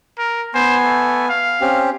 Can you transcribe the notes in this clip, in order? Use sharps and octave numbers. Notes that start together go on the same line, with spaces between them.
A#4
B3 C5 G#5
A3
F5
C4 C#4 G4